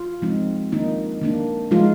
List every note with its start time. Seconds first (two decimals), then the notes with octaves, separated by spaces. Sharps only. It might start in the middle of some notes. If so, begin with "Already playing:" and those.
Already playing: F4
0.22 F3 G#3 C4 D#4
0.72 D#3 A#3 D4 D#4
1.21 D#3 A#3 D4
1.71 F3 G#3 D#4 F4